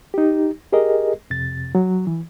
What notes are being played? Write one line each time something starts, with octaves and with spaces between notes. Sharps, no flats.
D#4 G4
G4 G#4 A#4 D#5
F2 C3 A6
F#3
E3